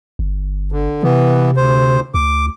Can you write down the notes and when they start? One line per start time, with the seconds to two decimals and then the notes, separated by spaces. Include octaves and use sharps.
0.19 G1
0.72 D3
1.03 C3 E3 B3
1.57 D2 C5
2.14 D2 D6